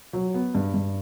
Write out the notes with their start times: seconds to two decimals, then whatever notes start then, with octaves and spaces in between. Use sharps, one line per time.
0.13 F#3
0.34 B3
0.55 G2
0.74 G2